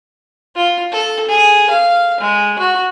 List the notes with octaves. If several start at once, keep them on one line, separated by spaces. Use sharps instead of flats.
F4
A4
G#4
F5
G#3
F#4